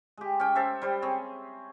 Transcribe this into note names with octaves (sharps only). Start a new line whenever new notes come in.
G#3 G4
C#4 G5
A4 C5 E5
G3 C5
C4 G#4 C#5